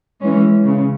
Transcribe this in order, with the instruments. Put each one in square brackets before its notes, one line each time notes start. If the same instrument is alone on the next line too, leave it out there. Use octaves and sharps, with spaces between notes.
[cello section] E3 G#3 C#4
C#3